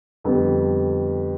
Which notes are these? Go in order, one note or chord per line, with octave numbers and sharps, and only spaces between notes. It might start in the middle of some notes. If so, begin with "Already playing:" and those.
F2 D3 G3 B3